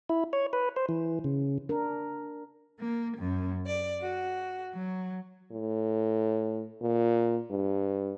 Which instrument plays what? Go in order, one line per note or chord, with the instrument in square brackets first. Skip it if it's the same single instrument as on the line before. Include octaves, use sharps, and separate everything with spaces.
[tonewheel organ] E4
C#5
B4
C5
E3
C#3
[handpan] D4 A#4
[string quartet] A#3
F#2
D5
F#4
F#3
[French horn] A2
A#2
G2